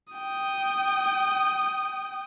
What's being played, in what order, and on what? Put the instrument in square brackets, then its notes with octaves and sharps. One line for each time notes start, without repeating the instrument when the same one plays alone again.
[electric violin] G5 D#6